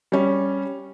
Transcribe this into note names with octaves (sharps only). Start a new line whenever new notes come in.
G3 C#4